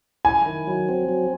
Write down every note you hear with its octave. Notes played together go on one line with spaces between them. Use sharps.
E4 G#5
D#3
F#3
C4
F#3